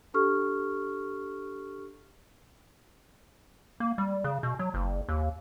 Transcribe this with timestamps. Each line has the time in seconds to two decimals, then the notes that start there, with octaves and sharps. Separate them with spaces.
0.14 D4 G4 A4 C#6 F6
3.80 A#3
3.98 G3
4.24 C#3
4.43 B2
4.59 F#3
4.74 F#1
5.09 D#2